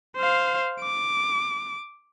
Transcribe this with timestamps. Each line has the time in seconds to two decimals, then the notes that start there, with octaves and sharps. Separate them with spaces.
0.17 C5 F5
0.81 D6